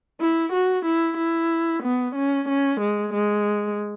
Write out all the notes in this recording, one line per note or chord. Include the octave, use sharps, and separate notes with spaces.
E4
F#4
E4
E4
B3
C#4
C#4
G#3
G#3